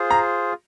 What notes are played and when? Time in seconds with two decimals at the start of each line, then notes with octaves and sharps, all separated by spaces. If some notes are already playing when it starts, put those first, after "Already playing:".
Already playing: F4 G#4 C5
0.11 A#5